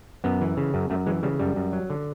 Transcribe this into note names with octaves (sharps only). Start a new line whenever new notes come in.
F#2 B3
E3
C#3
F#2
F#2 A3
E3 G#3
C#3 G3
F#2 G3
F#2
F#3
D3